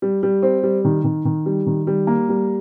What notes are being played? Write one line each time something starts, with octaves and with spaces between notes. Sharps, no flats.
G3
G3
C4
G3
D#3
D#3
D#3
G3
D#3
G3
A#3
G3